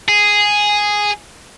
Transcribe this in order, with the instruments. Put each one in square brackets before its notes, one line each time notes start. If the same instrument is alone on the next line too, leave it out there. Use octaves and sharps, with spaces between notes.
[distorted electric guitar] G#4